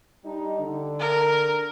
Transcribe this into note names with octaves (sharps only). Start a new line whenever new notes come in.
G3 D4 D#4
D3
A#4